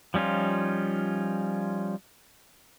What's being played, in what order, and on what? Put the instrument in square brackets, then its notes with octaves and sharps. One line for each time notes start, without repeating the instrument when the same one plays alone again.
[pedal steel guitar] F3 G3 C#4 D#4 F4